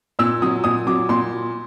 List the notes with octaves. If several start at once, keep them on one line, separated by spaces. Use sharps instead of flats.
A#2 E6
F#3 D#6
A#2 D#6
F#3 D6
A#2 C6